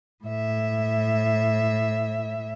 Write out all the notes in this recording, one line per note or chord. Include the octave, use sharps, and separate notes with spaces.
A2 E5